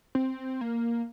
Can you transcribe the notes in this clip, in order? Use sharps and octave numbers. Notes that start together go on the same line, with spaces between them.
C4
A#3